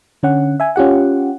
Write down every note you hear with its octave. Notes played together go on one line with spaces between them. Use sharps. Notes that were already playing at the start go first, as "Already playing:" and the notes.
D3 C#4 F#5
E5 G#5
C#4 F4 G4 F#5